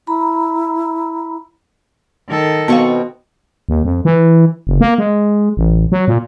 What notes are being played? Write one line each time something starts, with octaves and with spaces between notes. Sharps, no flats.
E4 A#5 B5
D#3 A4
B2 B3 C4 F5 C#6
D#2
F2
E3
F#1
A#3
G#3
A1
F#3
A#2